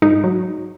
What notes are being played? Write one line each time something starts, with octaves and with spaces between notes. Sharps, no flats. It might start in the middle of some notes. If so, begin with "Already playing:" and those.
G#2 D#4
F#3